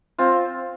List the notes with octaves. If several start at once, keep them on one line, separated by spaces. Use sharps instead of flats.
C4 F4